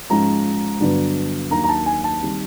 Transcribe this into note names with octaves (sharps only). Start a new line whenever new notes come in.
G#2 F3 G#3 C#4 A#5
G2 D3 F#3 B3 D4
D#2 D#3 F#3 A#3 D4 A#5
A#5
A5
G#5
A5
D#3 G3 C4